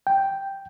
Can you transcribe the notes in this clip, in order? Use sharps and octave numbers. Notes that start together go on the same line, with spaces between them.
G5